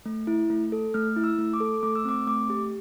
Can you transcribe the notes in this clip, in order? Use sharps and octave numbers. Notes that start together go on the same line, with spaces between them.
A3
E4
A3
A4
A3 F6
E4
E6
A3
D6
A4
A3 D6
E6
C4 D6
A3 D6
G4